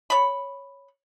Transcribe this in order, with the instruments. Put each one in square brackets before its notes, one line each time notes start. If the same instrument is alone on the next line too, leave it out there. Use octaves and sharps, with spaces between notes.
[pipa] C#5 B5